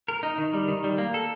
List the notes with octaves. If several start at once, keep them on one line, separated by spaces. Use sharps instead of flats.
A#4
D#4
D#3
G3
D#3
G3
A#3
A4